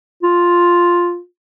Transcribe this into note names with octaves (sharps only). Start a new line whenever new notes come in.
F4